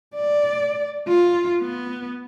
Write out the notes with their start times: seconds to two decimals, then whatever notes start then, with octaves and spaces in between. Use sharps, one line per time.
0.15 D5
1.08 F4
1.60 B3